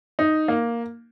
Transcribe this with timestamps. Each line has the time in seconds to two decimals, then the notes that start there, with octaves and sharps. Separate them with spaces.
0.19 D#4
0.48 A#3